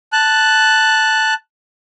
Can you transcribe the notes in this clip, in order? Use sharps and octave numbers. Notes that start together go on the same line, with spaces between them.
A5 F#6